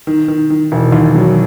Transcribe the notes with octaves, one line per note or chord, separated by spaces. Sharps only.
D#3
D#3
D#3
E1
D#2
F#3